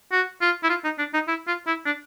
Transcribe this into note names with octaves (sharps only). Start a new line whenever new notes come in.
F#4
F4
E4
F4
D#4
D4
D#4
E4
F4
E4
D4